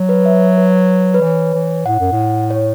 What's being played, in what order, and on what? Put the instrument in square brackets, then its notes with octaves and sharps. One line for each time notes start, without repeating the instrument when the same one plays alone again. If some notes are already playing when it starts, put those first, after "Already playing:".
Already playing: [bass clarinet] F#3
[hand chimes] B4
E5
B4
B4
[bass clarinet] E3 [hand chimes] C#5
[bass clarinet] E3
[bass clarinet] A2 [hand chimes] F#5
[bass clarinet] F#2
A2
[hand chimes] C#5